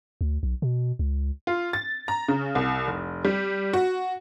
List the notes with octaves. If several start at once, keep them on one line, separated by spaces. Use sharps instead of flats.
D2
B1
B2
C#2
F4
A6
A#5
C#3
C2
F1
G3
F#4